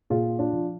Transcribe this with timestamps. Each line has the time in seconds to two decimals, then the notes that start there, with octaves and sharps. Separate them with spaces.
0.10 A#2 F4 G#4
0.39 D4 F4
0.53 F3